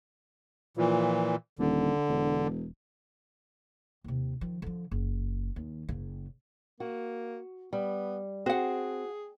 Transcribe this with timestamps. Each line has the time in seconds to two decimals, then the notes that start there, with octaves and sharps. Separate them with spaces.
0.77 A#2 E3 F3
1.59 D#1 D3
2.08 E1
4.04 D#2 C3
4.41 D#3 F3
4.62 D3 F3
4.91 F#1
5.56 D#2
5.89 F#1 C#3
6.80 A#3 F#4
7.73 G3 B3
8.46 C4 F#4 G#4 F#5